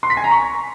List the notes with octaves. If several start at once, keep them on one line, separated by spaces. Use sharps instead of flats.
C6
B6
G#5
A#5
C#6